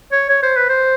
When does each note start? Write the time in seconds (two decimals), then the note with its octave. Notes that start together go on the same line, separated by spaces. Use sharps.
0.12 C#5
0.30 C#5
0.43 C5
0.57 B4
0.69 C5